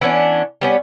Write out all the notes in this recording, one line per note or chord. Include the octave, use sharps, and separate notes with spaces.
E3 B3 C#4 D4
G3 B3 C#4